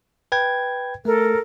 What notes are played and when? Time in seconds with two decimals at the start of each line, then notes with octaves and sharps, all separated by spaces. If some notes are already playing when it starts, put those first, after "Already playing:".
0.32 B4 G5 G#6
1.05 A3 A4 A#4